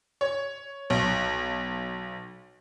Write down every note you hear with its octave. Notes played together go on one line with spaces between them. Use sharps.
C#5
B1